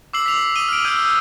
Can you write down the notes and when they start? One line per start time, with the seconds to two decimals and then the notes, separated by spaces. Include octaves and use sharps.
0.13 D6 E6 C7 F#7
0.26 B6 F7
0.56 D#6 D#7 G7
0.69 F6 D7
0.84 E6 F6 G6 G#6 D#7
1.05 E6